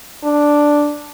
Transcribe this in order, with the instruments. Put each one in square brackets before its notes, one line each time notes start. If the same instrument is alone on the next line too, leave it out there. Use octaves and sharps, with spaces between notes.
[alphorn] D4